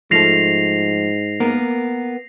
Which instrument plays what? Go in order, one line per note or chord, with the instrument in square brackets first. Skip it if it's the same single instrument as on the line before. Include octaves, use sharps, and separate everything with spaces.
[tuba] G#2 [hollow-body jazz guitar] F3 A3 A4 [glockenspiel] A#6 C7 F7
[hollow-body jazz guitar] A#3 B3 A#4